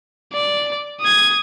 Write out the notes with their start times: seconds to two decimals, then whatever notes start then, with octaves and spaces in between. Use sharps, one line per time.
0.33 D5
1.01 D#6 G#6